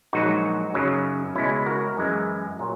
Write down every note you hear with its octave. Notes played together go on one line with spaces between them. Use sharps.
A#1 G#2 F#3 D#4 F#4
F#2 C#3 F#3
C#2 B2 G#3 C#4 E4
F#4 A#4
F#2 E3 G#3
A#2 F#3